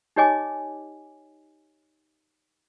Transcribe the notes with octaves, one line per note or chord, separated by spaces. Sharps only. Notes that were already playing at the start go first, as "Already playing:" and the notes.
D#4 G4 C#5 D#5 G#5 D6